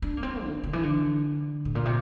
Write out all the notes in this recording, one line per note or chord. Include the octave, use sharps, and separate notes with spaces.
D4
A#3
C4
D3
D3
E3
D3
A2
A#2
C3